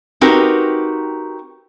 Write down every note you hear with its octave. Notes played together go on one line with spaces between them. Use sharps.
C4 D#4 F#4 G4 A#4 B4